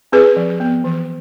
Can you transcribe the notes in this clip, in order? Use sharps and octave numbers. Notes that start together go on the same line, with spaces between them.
C4 G#4 B4
F3
B3
E3